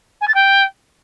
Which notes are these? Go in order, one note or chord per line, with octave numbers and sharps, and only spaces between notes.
G#5
A6
G5